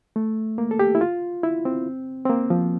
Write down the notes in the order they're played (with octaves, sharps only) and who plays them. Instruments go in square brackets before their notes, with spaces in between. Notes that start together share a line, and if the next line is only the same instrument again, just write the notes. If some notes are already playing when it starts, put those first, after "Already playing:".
[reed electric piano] A3
A#3
A4
G4
E4
F4
E4
C4
C4
A#3
F3